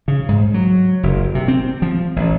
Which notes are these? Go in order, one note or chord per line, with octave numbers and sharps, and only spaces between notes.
C#3
G#2
F#3
F#1
C3
C4
F3
A1